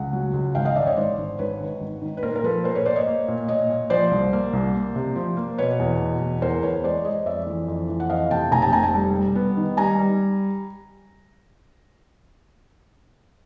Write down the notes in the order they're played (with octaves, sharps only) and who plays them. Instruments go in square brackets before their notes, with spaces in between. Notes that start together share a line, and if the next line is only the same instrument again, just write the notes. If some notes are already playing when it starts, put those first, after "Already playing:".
Already playing: [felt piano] C#2 F#5
F#3
C#2
G#1 F5 G5
D#5 F5
G#1 D5 E5
C#5 D#5
G#1 C5 D5
G#1
G#1 B4 C#5
D#3
G#1
D#3
B4
A#2 A#4 C5
A#4
F3 A4 B4
A#2 A#4 C5
B4 C#5
A#3 C5 D5
C#5 D#5
A#3
A#2
A#2 C#5 D#5
A#2
F3 C5 D5
C2
A#3
C2
A#3
C3
F3
A#3
B2 B4 C#5
E2
B2
E2
E2 A#4 C5
E2 B4 C#5
G#3 C5 D5
G#3 C#5 D#5
F2 D5 E5
E3
F2
E3
F#5
F2 D#5 F5
C3 G5 A5
F1 G#5 A#5
G5 A5
F1 G#5 A#5
G5 A5
G3
G3
B3
D#3
G3 G#5 A#5
G3